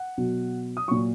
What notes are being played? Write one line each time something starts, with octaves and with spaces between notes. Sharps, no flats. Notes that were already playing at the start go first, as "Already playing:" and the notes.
Already playing: F#5
B2 F#3
D#6
A#2 F#3 C#6